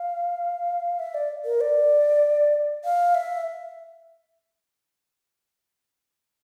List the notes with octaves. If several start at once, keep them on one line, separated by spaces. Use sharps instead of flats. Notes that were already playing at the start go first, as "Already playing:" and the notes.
Already playing: F5
E5
D5
A#4
D5
F5
E5